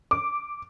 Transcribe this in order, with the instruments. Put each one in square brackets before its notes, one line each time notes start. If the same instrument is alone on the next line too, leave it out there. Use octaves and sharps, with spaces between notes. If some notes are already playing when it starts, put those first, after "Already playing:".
[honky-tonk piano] D6